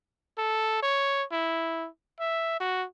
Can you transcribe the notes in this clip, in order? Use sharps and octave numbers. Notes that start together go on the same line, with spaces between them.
A4
C#5
E4
E5
F#4